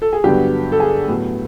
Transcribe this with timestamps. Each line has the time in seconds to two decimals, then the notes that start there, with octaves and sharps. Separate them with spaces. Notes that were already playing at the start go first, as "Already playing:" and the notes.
0.02 A4
0.13 G#4
0.24 G2 D3 F#3 B3 G4
0.72 A4
0.80 G#4
1.08 A2 F#3 B3